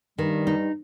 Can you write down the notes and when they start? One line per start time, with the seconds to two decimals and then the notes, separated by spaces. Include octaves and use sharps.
0.19 G2 D#3 G3
0.47 D#4